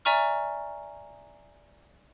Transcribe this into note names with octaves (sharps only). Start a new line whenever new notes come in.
D5 E5 G#5 A#5 C#6 F6